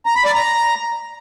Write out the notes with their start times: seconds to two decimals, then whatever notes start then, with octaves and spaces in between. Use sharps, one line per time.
0.06 A#5
0.15 B5
0.25 D5
0.35 A#5